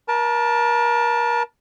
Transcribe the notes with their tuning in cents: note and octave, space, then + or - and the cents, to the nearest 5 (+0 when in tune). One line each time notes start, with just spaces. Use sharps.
A#4 +35 A5 +0